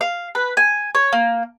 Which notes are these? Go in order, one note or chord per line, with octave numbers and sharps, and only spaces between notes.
F5
B4
G#5
C#5
A#3